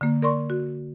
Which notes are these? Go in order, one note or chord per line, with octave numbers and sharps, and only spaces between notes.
D3 A#3
A#4 D5 C6 C#6
F#4